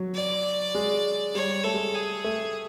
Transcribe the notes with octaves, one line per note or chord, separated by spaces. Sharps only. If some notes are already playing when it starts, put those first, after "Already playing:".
Already playing: F#3
D5
G#3
G3 C#5
A3 A4
G#3
G#4
A3